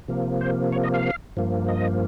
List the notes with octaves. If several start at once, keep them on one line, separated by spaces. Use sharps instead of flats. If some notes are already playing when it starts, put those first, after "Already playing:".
C3 F3 A#3
C5
C#5
D#5
F5
G2 F3 A#3
D#5